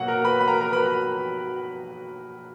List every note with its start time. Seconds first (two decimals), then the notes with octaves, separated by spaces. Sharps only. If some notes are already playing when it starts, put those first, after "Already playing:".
Already playing: B2 F#3 A#3 F#4 F#5
0.08 A#4 A#5
0.25 B4 B5
0.40 B5
0.48 A#4 A#5
0.60 A#4 A#5
0.72 B4 B5